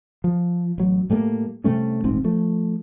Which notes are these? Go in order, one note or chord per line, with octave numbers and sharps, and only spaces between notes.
F3
A1 F#3
A2 G3 A3 A#3
C3 G3 A3 C#4
D#1 A1 G#2 C4
F3 A3